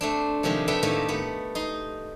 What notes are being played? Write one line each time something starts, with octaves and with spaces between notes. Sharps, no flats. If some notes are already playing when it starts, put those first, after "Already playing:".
A3 C4 D4
C3 D#3 F3 G#3 G4
A3 B3 D4 G4 E5 G5
A2 D#3 A3 A#3 C4 G4
A3 B3
D#4 C6